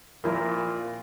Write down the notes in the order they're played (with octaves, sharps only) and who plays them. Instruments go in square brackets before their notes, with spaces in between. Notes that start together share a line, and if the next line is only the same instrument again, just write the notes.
[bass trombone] A#2 [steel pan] F3 E4 A#4